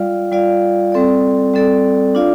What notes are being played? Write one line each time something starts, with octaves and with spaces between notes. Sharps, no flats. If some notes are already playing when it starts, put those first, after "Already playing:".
Already playing: G3 F4 D5 F5
G3 F4 D5 F5
G3 C4 A4 D5
G3 C4 A4 D5
D4 F4 D5 F5